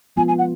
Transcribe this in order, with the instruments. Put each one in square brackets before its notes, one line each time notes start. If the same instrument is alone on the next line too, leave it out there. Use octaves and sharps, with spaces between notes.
[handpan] F3 G#3 B3 F4 [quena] G#5
[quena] G#5
F#5